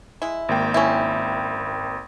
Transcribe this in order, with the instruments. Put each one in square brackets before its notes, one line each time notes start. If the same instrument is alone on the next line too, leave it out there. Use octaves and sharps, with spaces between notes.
[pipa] G#3 E4
[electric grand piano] G#1 A#3 G5
[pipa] C#4 E4